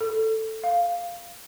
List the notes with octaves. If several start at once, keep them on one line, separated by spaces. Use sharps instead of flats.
A4
F5